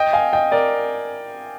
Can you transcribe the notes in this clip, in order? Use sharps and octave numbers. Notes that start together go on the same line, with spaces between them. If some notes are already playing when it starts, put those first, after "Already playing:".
Already playing: D#5 G5
F5 G#5
D#5 G5
A#4 D5